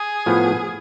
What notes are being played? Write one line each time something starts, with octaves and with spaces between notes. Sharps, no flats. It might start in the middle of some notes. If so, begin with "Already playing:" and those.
Already playing: G#4
A2 F3 B3